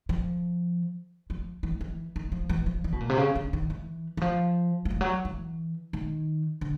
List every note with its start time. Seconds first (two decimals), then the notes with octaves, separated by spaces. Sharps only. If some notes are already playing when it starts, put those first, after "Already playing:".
0.09 F3
1.30 F3
1.63 E3
1.81 E3
2.16 D#3
2.32 F3
2.49 E3
2.66 F3
2.84 E3
2.92 B2
3.00 A#2
3.09 C3
3.18 C#3
3.35 D3
3.53 D#3
3.70 E3
4.17 E3
4.21 F3
4.85 F3
4.91 E3
5.01 F#3
5.25 E3
5.93 D#3
6.61 D3